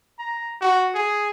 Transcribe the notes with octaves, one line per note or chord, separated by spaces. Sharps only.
A#5
F#4
G#4